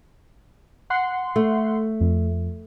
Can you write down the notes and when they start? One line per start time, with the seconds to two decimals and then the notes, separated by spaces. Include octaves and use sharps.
0.90 F#5 C6
1.36 A3
2.01 F2